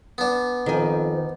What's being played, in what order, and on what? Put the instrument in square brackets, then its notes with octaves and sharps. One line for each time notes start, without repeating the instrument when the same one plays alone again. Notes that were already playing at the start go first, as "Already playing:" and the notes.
[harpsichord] B3 D4
[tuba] F2 [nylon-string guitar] D#3 G#5 [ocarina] C5